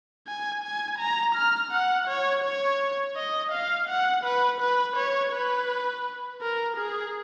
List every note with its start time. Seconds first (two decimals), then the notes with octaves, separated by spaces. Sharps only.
0.27 G#5
0.63 G#5
0.99 A#5
1.35 F6
1.71 F#5
2.08 C#5
2.44 C#5
3.16 D#5
3.52 F5
3.89 F#5
4.24 B4
4.61 B4
4.96 C#5
5.32 B4
6.42 A#4
6.77 G#4